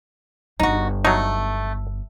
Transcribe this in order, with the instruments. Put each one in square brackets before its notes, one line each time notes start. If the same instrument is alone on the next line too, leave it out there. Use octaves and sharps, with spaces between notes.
[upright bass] G1 B3 [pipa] D#4 F#4
[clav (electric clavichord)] F#3 D#4 [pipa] A3